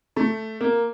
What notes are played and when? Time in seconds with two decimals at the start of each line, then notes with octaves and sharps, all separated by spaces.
0.16 A3
0.60 A#3